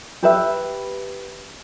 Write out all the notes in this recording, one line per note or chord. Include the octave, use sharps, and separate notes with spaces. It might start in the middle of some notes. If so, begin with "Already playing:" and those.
G4 B4 E5